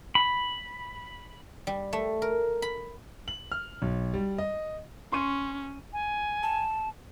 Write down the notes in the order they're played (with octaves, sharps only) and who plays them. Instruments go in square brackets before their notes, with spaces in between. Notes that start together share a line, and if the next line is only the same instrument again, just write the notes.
[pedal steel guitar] B5
[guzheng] G3
A3
A#4
B5
[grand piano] F#7
F6
B1
G3
D#5
[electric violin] C#4 [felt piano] C6 C#6 D#7
[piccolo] G#5
[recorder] A5